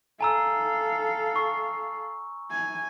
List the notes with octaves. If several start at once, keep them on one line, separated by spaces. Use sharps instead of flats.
A4 F5 G#5 A#5 E6
C#6
G#5